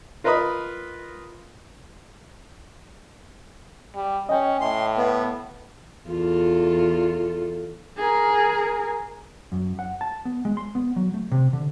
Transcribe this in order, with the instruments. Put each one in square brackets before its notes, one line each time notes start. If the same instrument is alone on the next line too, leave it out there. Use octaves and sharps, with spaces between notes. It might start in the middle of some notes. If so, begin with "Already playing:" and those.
[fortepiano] F4 A#4 B4 D#5 B5 D#6
[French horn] G3
[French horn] C#4 [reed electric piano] D#5 G5
[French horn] A2 [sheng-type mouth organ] C6
[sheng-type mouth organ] B3
[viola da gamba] E2 F4 A4
[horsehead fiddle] G#4 A#4
[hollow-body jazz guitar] F#2
F#5
A5
B3
G#3
C6
B3
F#3
A3
C3
D3